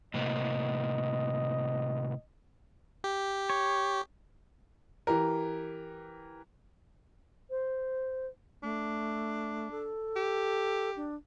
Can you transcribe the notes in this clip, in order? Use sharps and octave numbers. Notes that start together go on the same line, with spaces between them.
A2 C3 A#3 D#5
G4
C#5
E3 G4 A#4
C5
A3 D4
A4
G4
D4